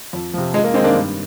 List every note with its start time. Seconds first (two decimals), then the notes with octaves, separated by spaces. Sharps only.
0.13 F2
0.34 C3 F3
0.54 F2 G#3
0.64 A#3
0.74 D#3 G#3 C4
0.84 A#3 D4
0.95 G2